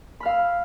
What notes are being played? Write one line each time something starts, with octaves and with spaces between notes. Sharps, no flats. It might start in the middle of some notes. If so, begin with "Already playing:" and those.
F5 B5 E6 F6